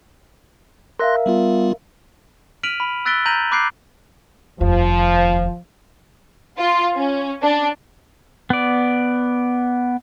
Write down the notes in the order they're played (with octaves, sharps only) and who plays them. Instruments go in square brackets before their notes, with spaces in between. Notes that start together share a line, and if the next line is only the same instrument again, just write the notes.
[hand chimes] A#4 E5 F5 [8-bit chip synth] C6 F#6 A#6
[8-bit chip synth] G3 B3 F4
[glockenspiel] F6 B6 D7 D#7 F7 F#7
B5
E6 F#6 A6 B6 D7 G7
A#5 G6 A#6 D#7 F7 F#7
B5 D6 F#6 G6 C7 D7
[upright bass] F1 D#2 [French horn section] F3
[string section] F4
C#4
D4
[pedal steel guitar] B3 D5